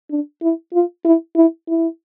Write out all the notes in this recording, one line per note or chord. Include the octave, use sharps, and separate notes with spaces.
D4
E4
F4
E4
E4
E4